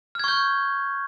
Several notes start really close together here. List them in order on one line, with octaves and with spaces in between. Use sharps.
F6 G#6 C#6 G6